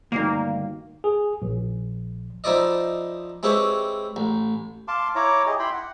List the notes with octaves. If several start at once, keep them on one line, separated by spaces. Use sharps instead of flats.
D2 G2 D#3 A#3
G#4
A#1
F3 D#4 E4 C5 D5 D#5
G#3 C4 E4 G4 B4 C#5
A1
F5 A5 C6 D6
E4 C#5 A#5 D6
G4 G#4 D#5
E4 G5 B5 C6
F#5